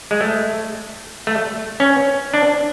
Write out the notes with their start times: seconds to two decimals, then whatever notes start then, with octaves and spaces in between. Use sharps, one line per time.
0.11 G#3
0.21 A3
1.27 A3
1.80 C#4
2.34 D4